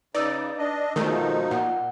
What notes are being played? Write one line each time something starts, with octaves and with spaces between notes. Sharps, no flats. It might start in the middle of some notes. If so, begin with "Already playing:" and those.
C#3 D#4 B4 D5 E6 A6
D4 D#5
B2 D#3 F3 G#3 A3 D#4 A#4
A#2 F#5